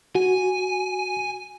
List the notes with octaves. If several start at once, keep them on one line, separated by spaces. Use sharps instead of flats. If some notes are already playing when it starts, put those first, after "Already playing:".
F#4 G#5